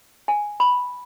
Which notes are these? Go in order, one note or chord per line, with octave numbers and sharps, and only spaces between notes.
G#5
B5